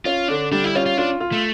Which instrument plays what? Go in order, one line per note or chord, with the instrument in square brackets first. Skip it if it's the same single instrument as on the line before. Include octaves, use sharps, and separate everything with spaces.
[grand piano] C#4 [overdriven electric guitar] F4
[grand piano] D3 [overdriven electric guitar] D4
[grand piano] G3 [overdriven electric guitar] D4
[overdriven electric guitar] E4
[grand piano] C#4 [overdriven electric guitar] F4
[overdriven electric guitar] F4
[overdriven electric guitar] D4 [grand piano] F4
[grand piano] F4
[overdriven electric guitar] A3